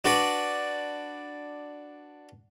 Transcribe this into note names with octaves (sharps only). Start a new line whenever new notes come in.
D4 F#4 B4 D5